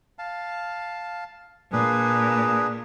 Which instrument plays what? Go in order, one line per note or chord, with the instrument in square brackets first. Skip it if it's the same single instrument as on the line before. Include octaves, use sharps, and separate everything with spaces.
[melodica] F5 A5
[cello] A#2 [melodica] D4 G#4 B4